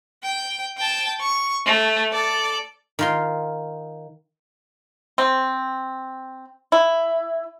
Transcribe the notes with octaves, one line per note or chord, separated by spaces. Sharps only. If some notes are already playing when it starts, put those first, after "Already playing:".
G5
G5 A5
C#6
A3
A4 D5
D#3 F4 C6
C4
E4